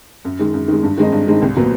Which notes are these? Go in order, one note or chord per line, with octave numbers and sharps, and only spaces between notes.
F#2
D#3 G#3
F#2
D#3 G#3
G2
D#3 G#3 C4 D#4
G2
D#3 G#3 C4 D#4
C2
A#2 F#3 B3